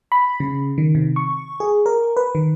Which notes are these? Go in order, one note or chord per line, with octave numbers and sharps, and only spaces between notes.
B5
C#3
D#3
C3
C#6
G#4
A#4
B4
D#3